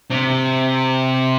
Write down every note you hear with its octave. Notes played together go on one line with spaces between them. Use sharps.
C3